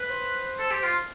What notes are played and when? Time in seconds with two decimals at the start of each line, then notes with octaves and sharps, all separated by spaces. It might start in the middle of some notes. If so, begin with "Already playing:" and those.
Already playing: B4
0.10 C5
0.59 A4
0.71 G4
0.83 F4